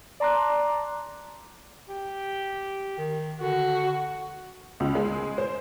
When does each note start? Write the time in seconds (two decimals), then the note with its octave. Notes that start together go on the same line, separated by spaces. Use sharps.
0.20 D5 A5 A#5 C6 D6 F#6
1.89 G4
2.98 D#3
3.41 D3 F#4
4.80 C#2
4.95 G#3
5.38 C5